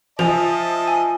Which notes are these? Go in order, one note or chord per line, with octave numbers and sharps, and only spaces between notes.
F3 D#5 E5 G#5 A5 F7
G#5